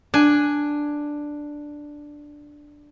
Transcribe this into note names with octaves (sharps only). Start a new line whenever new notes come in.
D4 G#5